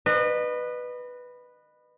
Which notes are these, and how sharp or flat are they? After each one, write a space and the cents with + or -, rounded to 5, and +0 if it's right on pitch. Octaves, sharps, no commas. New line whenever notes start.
B4 +0 D#5 -35